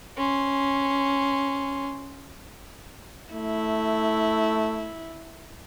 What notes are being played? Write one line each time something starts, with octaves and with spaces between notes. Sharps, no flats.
C#4 C6
A3 E4